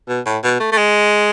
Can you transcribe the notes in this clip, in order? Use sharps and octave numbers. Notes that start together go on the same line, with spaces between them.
B2
A2
B2
A3
A3
G#3